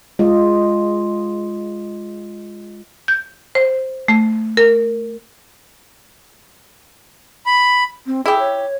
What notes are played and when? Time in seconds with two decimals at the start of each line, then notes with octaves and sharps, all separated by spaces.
0.19 G#3 F4 D#5
3.08 G6
3.55 C5
4.08 A3
4.57 A#4
7.46 B5
8.06 C4
8.26 E4 G4 G#4
8.39 C#5